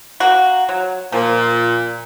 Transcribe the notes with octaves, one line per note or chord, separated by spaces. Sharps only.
A#3 F#4
F#3
A#2 F3